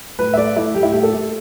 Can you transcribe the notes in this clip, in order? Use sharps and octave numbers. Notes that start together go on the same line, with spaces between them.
A2 B4
E5
A3 D5
A3 E4
A2 G4
E4
A3 G4
A4
A3